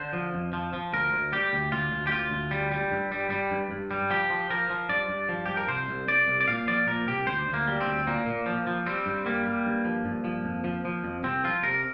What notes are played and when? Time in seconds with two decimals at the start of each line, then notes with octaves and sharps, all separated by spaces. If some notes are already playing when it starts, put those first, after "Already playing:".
Already playing: D3 C5
0.13 F3
0.34 F2
0.53 F3
0.73 F3
0.93 D2 A#4
1.13 D2
1.32 G3 G4
1.53 D2
1.72 D2 F4
1.92 D2
2.07 G4
2.12 D2 F4
2.31 D2
2.51 G3
2.72 G3
2.91 G2
3.12 G3
3.30 G3
3.51 G2
3.71 G2
3.91 G3
4.10 F3 G4
4.30 F3
4.50 F3 A#4
4.70 F3
4.89 G2 D5
5.09 G2
5.29 F3
5.46 G2 G4
5.57 A#4
5.68 C2 C5
5.89 C2
6.08 C2 D5
6.28 C2
6.41 D5
6.48 A#2 F5
6.67 F3 D5
6.87 A#2 A#4
7.07 C2 G4
7.27 D2 C5
7.48 D2
7.54 A#3
7.67 G3
7.81 C4
7.86 D2
8.07 A#2 A#3
8.26 A#2
8.46 F3
8.67 F3
8.86 G3 C4
9.06 G2
9.26 G3 A#3
9.46 G3
9.66 G2
9.85 F3
10.05 G2
10.25 F3
10.45 F2
10.64 F3
10.85 F3
11.04 F2
11.24 C2 C4
11.44 F3 F4
11.63 C3 A#4